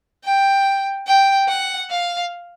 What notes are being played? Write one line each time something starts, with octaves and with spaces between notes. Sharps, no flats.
G5
G5
F#5
F5